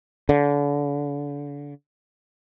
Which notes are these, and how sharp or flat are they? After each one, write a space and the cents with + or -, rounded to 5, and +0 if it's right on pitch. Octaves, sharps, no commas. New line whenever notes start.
D3 -35